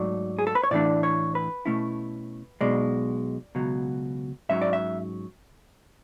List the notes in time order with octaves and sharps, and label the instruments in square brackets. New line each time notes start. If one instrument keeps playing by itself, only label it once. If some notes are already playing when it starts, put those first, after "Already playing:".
Already playing: [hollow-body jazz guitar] G#2 F#3 A3 D5
G#4
A4
B4
C#5
A2 E3 A3 D4 D5
C#5
B4
B2 A3 C#4 E4
B1 B2 G#3 D5
C#2 B2 F#3
G#2 F#3 C#4 E5
D5
E5